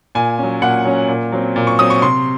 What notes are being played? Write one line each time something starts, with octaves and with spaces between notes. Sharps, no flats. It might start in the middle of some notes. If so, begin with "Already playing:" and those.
A#2 G#5
F#3 C#4
A#2 F#5
F#3 C#4
A#2
F#3 C4
A#2
C#6
F#3 C4 D#6
C#6
C3 C6